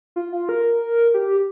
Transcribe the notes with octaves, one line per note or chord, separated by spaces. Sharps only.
F4
F4
A#4
G4